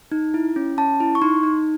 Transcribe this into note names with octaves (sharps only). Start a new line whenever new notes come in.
D#4
E4
C#4
C#4 A5
E4
C#6
D#4 C6
D#4